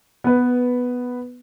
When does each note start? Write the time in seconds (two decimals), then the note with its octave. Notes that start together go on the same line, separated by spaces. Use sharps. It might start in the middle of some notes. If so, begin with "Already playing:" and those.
0.24 B3 B4